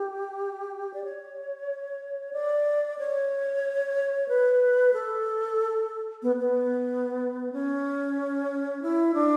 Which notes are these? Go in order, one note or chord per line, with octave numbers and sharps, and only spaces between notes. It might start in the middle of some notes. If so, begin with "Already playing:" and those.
Already playing: G4
D5
C#5
D5
C#5
B4
A4
B3
B3
C#4
E4
D4